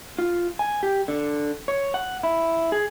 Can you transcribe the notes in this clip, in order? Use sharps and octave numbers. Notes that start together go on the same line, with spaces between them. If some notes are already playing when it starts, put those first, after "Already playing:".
F4
G#5
G4
D3
C#5
F#5
E4
G#4